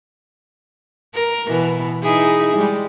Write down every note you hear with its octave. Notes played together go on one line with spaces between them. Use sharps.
A#4
B2 E3
D#4 E4 G#4
G3 G#3